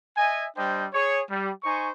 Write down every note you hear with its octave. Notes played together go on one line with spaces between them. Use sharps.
D#5 E5 G#5
G3 D4 C5 D#5 G5
G#4 C#5
G3
D#4 C5 G#5 C#6